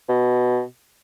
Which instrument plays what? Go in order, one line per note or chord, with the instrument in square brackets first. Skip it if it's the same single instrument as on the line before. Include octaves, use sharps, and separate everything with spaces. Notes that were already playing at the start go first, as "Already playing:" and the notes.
[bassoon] B2